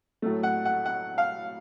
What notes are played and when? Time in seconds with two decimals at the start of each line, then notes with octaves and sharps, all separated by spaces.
0.22 A2 F#3 A3
0.43 F#5
0.65 F#5
0.86 F#5
1.18 F5